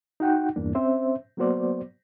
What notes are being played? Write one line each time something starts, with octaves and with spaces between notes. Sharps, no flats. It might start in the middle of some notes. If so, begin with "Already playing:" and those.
D#4 F#4 F#5 G5
E2 G2 A#3 D4
C4 C#4 C5 E5
F#3 A#3 B3 F#4 C5 D5